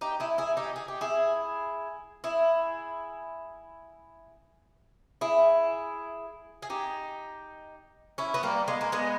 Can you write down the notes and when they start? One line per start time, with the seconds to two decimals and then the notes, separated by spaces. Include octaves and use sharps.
0.01 D#4 G4
0.20 E4 G#4
0.38 E4 G#4
0.57 D#4 G4
0.76 G#4
0.88 G4
1.01 E4 G#4
2.24 E4 G#4
5.21 E4 G#4
6.62 G#4
6.70 D#4 G4
8.18 C#4 E4
8.34 B3
8.43 G3 A#3
8.68 G#3 B3
8.81 A#3
8.92 G#3 B3